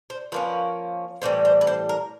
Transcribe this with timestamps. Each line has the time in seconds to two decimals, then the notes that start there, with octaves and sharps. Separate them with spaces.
0.10 C5
0.32 F3 A#3 C#4 B4
1.22 A2 E3 G3 C5
1.45 C5
1.61 B4
1.67 C5
1.89 A#4